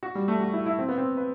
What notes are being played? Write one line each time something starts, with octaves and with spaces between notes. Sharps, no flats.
F#4
G3
A3
F#4
E4
E4
C4
B3
C4
B4